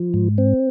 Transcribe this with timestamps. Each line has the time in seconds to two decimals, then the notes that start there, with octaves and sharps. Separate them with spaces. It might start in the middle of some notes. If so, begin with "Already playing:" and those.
Already playing: F3
0.14 G#2
0.38 C4